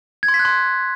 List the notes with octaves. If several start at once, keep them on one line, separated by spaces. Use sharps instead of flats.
G#6
C6
B6
F#6
C6